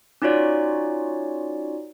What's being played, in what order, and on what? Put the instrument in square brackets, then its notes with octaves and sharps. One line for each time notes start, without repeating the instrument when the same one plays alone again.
[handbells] C#4 D#4 F4 F#4 C#5 D5